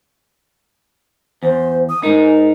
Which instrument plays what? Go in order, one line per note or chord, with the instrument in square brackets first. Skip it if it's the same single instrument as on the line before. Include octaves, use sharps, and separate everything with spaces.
[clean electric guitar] E2 [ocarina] C5
[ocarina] D#6
[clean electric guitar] G#2 D#4 [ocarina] A#4